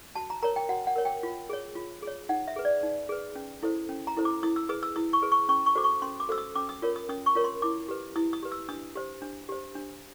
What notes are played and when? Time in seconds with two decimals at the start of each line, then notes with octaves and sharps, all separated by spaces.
0.15 F#4 A5
0.30 A#5
0.42 A#4 C#5 A#5
0.56 G5
0.69 F#4 F#5
0.87 F#5
0.96 A#4 C#5
1.05 G5
1.23 F4
1.49 G#4 C#5
1.75 F4
2.02 G#4
2.07 C#5
2.29 D#4 F#5
2.48 E5
2.56 G#4 B4
2.65 D5
2.83 D#4
3.09 G#4 B4
3.35 C#4
3.63 E4 A4 C5
3.89 C#4
4.07 A#5
4.16 E4 A4 C5
4.25 D6
4.43 E4 D#6
4.56 E6
4.69 G#4 B4 D#6
4.83 E6
4.96 E4 D#6
5.13 C#6
5.22 G#4 B4
5.32 C#6
5.49 C#4 C#6
5.66 C#6
5.75 F#4 A4 C5 D6
5.84 C#6
6.02 C#4 C6
6.20 D6
6.29 F#4 A4 C5 E6
6.38 D#6
6.56 C#4 D6
6.69 D#6
6.82 F4 A#4 C#5
6.96 D#6
7.09 C#4 D#6
7.26 C#6
7.35 F4 A#4 C#5
7.44 C6
7.62 E4 D6
7.88 G4 B4
8.16 E4 D#6
8.33 D#6
8.42 G4 B4
8.52 E6
8.69 D4 D#6
8.96 G4 C5
9.22 D4
9.49 G4 C5
9.75 D4